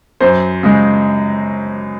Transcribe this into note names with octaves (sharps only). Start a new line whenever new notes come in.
F#2 C5
C#3 G#3